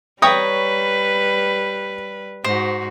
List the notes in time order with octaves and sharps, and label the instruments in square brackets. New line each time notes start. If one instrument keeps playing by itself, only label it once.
[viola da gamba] G3 B4 [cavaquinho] C#5 A#5 C#6 [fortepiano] G5 D#6
[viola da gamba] G#2 F#4 [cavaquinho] C5